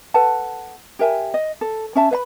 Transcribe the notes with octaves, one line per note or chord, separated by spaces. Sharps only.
A4 B4 F#5 A5
G4 A#4 E5 G#5
D#5
A4
C#4 E5 A5
B4 E5 B5